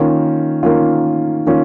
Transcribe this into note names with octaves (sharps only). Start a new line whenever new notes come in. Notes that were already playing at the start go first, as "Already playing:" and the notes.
Already playing: D#3 A#3 C#4 F4
D#3 A#3 C#4 F4
D#3 A#3 C#4 F4